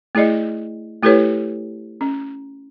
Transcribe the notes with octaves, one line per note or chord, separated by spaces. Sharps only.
A3 E4 G#4 D5 D#5
A3 E4 G4 A4 B4 C#5
C#4